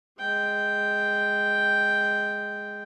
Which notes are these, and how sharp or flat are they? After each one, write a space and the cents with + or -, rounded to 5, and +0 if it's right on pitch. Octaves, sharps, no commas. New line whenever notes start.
G#3 +0 G5 +0